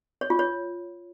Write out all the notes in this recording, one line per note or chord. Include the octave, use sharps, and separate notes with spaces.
C#5
F4
C#5